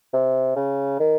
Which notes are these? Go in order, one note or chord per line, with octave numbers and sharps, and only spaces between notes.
C3
C#3
D#3